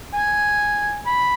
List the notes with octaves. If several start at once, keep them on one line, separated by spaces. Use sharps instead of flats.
G#5
B5